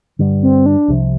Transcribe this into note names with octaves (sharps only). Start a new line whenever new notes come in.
G2 D3 G3
C4
D4
C2 C3 F3